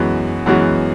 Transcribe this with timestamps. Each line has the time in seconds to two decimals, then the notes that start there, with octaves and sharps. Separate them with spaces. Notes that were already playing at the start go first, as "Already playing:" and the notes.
Already playing: F#2 E3 G#3 B3 F#4
0.46 F#2 E3 G#3 B3 F#4